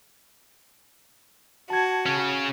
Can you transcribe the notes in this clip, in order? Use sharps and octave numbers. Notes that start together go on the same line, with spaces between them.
F#4 A5 G#6
C#3 C#4